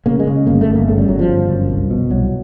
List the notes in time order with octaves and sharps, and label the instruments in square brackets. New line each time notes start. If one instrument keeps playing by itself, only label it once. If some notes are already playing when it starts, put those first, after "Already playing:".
[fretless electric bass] C#3 A#3
G#3
C#3
G1 A#3
A3
G1
A#3
C#3 A3
G3
G1 F#3
F3
G1
F#2
C2
B2
C2 F#3